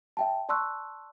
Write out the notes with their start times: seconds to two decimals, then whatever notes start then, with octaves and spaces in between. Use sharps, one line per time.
0.17 E5 G5 A5
0.49 D5 A5 C6 C#6 E6 F#6